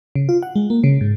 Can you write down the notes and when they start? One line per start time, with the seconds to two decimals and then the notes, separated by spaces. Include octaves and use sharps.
0.15 C#3
0.29 F4
0.43 F#5
0.56 G#3
0.70 A#3
0.84 C#3
1.01 G#2